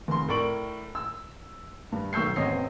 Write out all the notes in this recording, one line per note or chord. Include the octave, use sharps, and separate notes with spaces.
F1 C6
A2 A#4 D5 C#6 D7 F#7
E6
G2
B1 C#6 E6 G6 C7
A1 E2 C4 C#5 D#5 C7